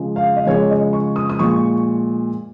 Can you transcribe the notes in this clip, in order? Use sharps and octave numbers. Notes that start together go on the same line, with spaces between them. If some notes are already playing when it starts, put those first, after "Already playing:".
Already playing: C#3 F3 G#3
F5
D#5
C#3 F3 G#3 C#5
D#5
C#6
D#6
D#6
A#2 F3 G#3 C#6